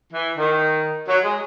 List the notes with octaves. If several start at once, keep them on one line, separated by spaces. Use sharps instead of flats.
E3
D#3
F#3
G#3